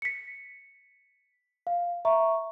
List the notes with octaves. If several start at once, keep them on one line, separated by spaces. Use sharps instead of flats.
B6 C#7
F5
E5 A#5 C#6